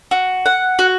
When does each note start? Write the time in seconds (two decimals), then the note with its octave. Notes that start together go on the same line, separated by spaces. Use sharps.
0.11 F#4
0.46 F#5
0.79 F#4